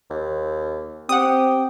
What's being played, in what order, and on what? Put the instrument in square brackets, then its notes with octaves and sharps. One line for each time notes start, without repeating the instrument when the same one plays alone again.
[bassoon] D#2
[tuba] C4 [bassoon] G4 [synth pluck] F#5 D#6